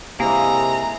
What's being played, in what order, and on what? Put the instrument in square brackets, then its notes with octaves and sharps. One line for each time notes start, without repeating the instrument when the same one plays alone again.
[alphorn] C3 [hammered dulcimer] G#3 E4 G#4 [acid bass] A#3 [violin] A#5